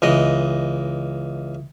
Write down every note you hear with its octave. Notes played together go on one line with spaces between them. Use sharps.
C#2 E3 D#5